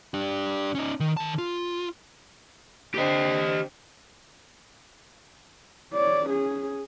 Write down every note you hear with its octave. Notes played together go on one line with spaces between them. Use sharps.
D4 G4
C#4 D#4
D#3
D#3 A5
F4
D3 C4 G4 D#5
C#5 D5
C#4 G#4